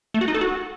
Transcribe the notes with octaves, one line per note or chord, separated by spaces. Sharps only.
A3
F#4
D#4
A4
F#4